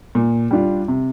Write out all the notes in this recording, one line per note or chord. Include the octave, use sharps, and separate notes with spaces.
A#2
G3 D4 F4
C3